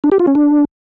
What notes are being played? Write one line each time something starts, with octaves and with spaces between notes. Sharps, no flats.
D4
G4
F4
C#4
D4